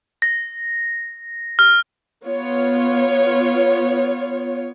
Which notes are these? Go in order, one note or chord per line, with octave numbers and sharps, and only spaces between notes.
A#6
F6
B3 F4 C#5